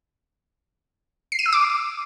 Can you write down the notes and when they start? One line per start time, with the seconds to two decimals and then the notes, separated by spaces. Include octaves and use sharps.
1.32 C7
1.39 D#7
1.46 E6
1.53 D6